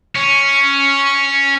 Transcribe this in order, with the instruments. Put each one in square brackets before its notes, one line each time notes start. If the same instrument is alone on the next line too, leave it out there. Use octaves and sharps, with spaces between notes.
[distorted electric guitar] C#4